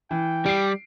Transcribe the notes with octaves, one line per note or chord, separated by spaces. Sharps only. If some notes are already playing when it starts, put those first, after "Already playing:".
E3 G5
G3 C7 D7